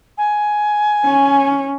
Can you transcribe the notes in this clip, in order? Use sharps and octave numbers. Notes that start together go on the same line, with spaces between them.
G#5
C#4